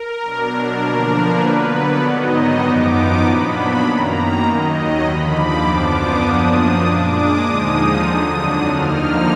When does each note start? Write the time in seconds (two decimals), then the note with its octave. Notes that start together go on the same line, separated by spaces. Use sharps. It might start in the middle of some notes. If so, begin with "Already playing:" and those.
Already playing: A#4
0.21 B2 F#3 D4
0.51 A#4
0.81 D3 F3 A#3 D4 A#4
1.11 B4
1.41 D3 F#3 B3
1.72 D5
2.01 G#2 D#3 F#3 B3 D#4 D#5
2.61 F#2 F3 B3 D#4 D6
2.91 D#6
3.21 A#2 F#3 B3 D4 B5
3.82 F#2 D#3 A#3 A#5
4.42 D#2 D#3 F#3 D#5
5.02 D#2 D3 F3 B5
5.32 D6
5.63 F#2 F3 B3 D4 D6
5.92 D#6
6.23 F#2 F3 A#3 D4 D#6
6.83 A#2 G#3 D4 D6
7.13 D#6
7.43 D#2 D3 F3 G#3 D#4
8.03 F2 D3 F#3 D4 D#6
8.63 D#2 D3 F3 A#3 D#4 F6